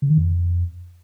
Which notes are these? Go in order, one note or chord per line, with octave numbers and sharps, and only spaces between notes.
C#3
D#3
F2